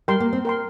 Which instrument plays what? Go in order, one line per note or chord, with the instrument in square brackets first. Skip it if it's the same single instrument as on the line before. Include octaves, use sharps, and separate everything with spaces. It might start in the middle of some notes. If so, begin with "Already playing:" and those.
[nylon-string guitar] G3 [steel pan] A#4 G5 C6
[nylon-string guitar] A#3
C4
[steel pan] A#4 G5 C6